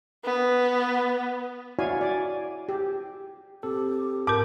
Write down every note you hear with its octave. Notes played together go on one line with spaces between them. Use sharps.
B3
E4 F#4 C#5 D5 F5 G#5
D5 G#5
G4
C4 G4 A4
G#2 A#4 D6